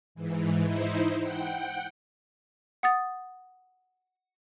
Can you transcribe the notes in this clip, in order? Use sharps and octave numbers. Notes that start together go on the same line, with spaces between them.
G#2 E3
D#4 E4 C5
F#5 G5
F#5 D#6 A6